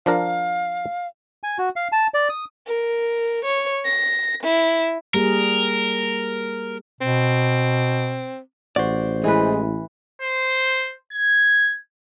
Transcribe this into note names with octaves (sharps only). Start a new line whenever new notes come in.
F3 D4 A#4 F5
G#5
F#4
F5
A5
D5
D#6
A#4
C#5
A#6
E4
G3 A#3 G#4 A#4
B2 C4
A1 F#4 C5 D5
E3 G#3 B4
C5
G#6